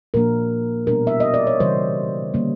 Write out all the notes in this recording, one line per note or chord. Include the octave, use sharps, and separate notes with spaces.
A#2 F3 A#3 D4 A#4
B2 G3 B3 D4 A#4
E5
D#5
D5
C#5
C#3 E3 G3 C5
D3 G3 A#3 C#4